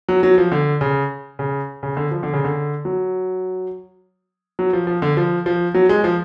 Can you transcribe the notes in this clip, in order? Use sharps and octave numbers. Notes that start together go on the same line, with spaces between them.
F#3
F#3
F3
D3
C#3
C#3
C#3
D3
F3
D3
C#3
D3
F#3
F#3
F3
F3
D3
F3
F3
F#3
G#3
F3